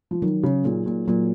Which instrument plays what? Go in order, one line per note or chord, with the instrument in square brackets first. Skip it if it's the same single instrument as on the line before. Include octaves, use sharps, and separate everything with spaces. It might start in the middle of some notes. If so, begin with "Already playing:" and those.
[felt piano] F3
[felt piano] D#3 [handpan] F#3
[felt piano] C#3
[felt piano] A#2 [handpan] A#3 D#4 G#4
[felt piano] A#2
[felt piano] A#2 [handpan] F#3